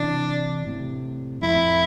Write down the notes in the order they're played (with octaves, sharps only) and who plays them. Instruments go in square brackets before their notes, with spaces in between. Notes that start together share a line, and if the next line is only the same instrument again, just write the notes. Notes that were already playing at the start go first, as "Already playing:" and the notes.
Already playing: [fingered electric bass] C3 E3 [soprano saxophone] D4
[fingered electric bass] A2 C3
[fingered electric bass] F2 A2 [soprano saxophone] E4